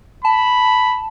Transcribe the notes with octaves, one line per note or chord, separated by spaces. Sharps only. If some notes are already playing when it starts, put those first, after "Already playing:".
A5 B5